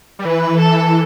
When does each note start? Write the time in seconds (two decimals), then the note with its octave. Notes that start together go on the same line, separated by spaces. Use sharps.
0.19 G3
0.25 E3 B4
0.59 A4